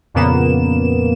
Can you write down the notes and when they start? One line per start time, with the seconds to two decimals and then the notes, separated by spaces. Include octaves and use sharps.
0.14 F2 A#2 C#3 A#3 B3 E7